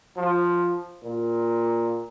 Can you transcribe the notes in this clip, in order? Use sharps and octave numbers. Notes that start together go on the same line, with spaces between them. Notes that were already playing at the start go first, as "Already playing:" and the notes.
F3
A#2